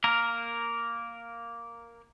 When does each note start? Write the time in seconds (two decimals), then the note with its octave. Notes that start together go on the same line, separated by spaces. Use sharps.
0.04 A#3 A#4